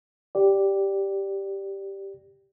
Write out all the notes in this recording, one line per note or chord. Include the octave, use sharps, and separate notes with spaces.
G4 D5